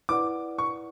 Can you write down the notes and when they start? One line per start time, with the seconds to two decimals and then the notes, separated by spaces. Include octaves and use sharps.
0.09 E4 B4 D5 F#5 D6
0.58 C#6